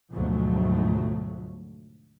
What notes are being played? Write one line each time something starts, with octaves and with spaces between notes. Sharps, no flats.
D2 G#2 B2 F3 F#3 A3